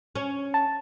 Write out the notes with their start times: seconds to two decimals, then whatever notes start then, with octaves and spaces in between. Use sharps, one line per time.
0.15 C#4
0.54 A5